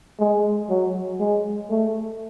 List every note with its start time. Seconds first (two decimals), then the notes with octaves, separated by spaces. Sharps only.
0.20 G#3
0.69 F#3
1.20 G#3
1.70 A3